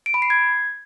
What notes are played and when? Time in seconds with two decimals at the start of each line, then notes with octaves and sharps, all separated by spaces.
0.06 D7
0.14 B5
0.22 C7
0.30 G#6